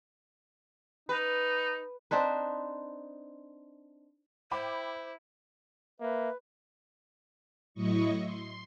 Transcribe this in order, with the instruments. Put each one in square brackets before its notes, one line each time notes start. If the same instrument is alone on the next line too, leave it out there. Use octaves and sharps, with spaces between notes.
[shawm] D#4 [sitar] B4
[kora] C4 D4 D#4 B4
[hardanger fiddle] E4 [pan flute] C5 [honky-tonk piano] G5 B5 D6
[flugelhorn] A#3 [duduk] B4 [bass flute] E5
[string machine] A2 F#3 E4 D#5 C#6
C6